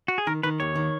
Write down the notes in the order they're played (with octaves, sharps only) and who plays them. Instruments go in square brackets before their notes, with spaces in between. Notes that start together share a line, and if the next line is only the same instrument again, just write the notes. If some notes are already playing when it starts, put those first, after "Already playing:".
[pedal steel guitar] F#4
G#4
[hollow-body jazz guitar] D#3 [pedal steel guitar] A#4
[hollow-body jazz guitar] D#3 [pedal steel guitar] B4
[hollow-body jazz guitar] D#2 [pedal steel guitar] C#5
[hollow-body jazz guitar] D#3